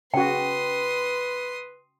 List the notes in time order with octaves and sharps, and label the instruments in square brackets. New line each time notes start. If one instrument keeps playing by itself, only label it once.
[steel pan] C#3 F#4 [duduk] B4 [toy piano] G5 [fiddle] C6 D#6